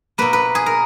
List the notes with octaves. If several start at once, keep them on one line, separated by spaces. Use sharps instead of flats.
B2 A#3 B4
B4
G#4
A#4